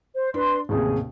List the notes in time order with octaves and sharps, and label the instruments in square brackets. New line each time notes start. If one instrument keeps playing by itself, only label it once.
[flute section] C5
[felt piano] D4 [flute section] B4 C6
[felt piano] A1 D#2 C3 [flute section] G#4